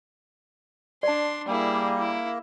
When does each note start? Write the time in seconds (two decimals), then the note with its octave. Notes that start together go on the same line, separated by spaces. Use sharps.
1.03 D4 D5 A5 C6
1.48 G3 A#3 E4 G#4
1.99 E4